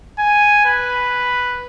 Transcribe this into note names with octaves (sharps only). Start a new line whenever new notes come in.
G#5
B4